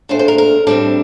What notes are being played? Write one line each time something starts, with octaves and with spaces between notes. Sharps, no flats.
A#2 A3 D4 C5
C5
A#4
A#4
A2 G3 C4 D4